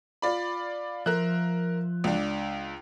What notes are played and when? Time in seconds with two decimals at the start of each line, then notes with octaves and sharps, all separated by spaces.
0.22 F4 D5 B5
1.06 F3 F4 A#4 E5 F#6
2.04 C#2 D4